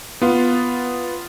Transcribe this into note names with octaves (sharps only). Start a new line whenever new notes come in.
B3 F4